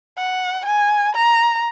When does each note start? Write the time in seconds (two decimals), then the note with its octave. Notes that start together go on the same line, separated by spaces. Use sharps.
0.17 F#5
0.65 G#5
1.15 A#5